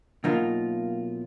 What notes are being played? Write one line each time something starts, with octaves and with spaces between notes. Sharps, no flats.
B2 F#3 A#3 D#4 F4 A#4